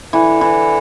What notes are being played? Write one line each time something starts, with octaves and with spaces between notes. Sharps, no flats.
D3 E3
E3